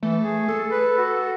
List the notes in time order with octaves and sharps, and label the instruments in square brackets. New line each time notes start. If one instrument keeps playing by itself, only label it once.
[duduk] E3 [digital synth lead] A3
[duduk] G#4
[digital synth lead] A4
[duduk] B4
F#4